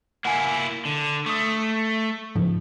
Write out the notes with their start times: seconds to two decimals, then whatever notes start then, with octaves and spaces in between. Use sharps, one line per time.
0.25 A#3 E4 F#5 G#5
0.85 D3
1.26 A3 D6 D#6
2.35 G#2 C#3 F3